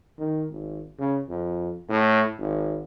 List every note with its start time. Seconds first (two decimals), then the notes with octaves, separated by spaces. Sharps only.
0.18 D#3
0.50 G#1
0.99 C#3
1.29 F2
1.89 A2
2.38 G#1